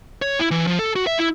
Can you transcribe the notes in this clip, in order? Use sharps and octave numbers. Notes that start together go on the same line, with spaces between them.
C#5
E4
E3
F3
A4
F#4
E5
E4